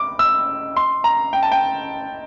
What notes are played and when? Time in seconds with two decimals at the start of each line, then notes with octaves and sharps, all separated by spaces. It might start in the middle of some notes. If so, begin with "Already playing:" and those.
Already playing: D6
0.19 E6
0.77 C6
1.04 A#5
1.33 G5
1.43 A5
1.52 G5